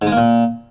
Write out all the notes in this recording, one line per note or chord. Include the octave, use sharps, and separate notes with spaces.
G#2
G#3
A#3
A#2